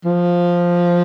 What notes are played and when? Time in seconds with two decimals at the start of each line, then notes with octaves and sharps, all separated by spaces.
0.05 F3